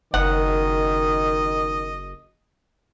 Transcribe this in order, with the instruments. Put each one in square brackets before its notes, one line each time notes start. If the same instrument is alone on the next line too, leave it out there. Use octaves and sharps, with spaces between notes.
[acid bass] F#1 [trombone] D#3 [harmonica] D#5 [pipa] F#5